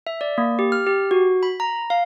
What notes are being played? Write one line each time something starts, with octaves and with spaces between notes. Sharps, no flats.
E5
D5
A#3
G4
F6
G4
F#4
B5
A#5
F5